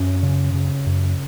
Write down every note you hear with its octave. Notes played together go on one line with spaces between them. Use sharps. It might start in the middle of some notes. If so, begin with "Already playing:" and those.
Already playing: F#2 C#4
C#3
C#3
F#2